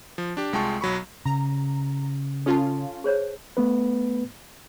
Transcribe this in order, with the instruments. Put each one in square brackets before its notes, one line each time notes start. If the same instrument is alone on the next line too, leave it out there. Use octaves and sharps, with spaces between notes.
[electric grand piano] F3
D4 G4
C2 G#3 F4 G5 A5 C#6
B1 F#3 B5 C#6
[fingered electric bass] C#3 [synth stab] A#5
[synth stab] C#4 F4 [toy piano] A4 A5
[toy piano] G#4 C5 C#5
[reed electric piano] A3 B3 B4